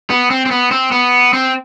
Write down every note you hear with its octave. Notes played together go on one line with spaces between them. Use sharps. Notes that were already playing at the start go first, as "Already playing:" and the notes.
B3
C4
C4
B3
C4
B3
C4